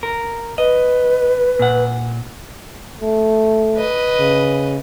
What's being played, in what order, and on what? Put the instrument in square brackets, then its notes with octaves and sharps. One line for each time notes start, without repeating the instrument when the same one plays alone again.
[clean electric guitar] A#4
[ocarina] B4 [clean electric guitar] D#5
[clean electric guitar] A#2 F#5
[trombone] A3
[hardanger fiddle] B4 D#5
[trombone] C#3